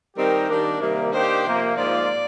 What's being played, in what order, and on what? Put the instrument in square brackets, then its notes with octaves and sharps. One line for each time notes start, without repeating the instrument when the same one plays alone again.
[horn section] D#3 G3 C4 D#4 G4 [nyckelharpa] A#4
[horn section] D#3 G3 A#3 D4
C3 D#3 G3 A#3
[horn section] D#3 A#3 D4 G4 [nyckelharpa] C5
[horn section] C3 F3 A#3
[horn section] G#2 F3 A#3 F4 [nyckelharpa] D5